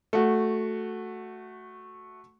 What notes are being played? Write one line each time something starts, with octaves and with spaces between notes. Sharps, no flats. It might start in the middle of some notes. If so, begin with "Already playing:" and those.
A3 F#4